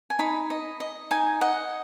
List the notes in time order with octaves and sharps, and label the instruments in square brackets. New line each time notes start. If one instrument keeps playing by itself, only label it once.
[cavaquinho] G#5
D#4 B5
D#5
D#5
D#4 G#5
D#5 F#5